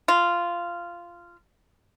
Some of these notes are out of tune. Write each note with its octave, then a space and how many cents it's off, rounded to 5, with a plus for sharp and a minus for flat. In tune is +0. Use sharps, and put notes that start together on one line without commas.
F4 -10